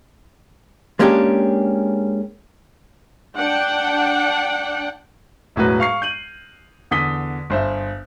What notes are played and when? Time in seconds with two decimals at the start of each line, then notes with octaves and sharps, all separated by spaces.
0.99 G#3 A#3 C#4 D4 G4
3.38 D4 F#5 G5
5.56 E1 A2 F#3 F#4 B4
5.80 F5 C#6 C7
6.02 G6 D#7 F#7
6.91 E2 D3 D#6 B6 G7
7.50 G1 C5 E5